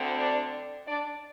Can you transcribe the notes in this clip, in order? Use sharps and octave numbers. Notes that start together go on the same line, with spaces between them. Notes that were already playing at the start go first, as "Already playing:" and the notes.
Already playing: D2 D3 C4
D4 D5
D4 D5